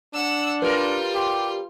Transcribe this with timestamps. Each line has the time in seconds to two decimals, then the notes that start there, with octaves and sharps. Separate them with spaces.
0.14 D4 F#5 E6
0.62 G3 F4 A#4 B4 C6
1.14 G4